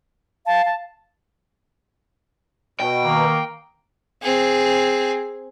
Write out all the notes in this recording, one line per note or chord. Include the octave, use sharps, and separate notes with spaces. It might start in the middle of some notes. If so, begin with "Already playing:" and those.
F5 A5
A5
B2 G5
D#3 A#3
C4 G#4